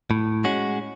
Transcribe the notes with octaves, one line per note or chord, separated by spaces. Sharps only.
A2
G#3 C#4 F#4